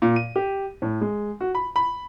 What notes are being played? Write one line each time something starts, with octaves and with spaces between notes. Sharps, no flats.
A#2
D#7
G4
A2
G#3
F#4
B5
B5